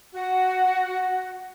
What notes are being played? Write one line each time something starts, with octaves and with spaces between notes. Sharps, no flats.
F#4 F#5